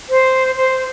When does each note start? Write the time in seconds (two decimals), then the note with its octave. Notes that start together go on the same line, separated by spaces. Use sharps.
0.10 C5
0.56 C5